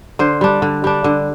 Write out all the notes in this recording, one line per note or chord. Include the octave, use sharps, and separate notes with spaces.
D3 C5
G3 D4
D3
G3 D4
D3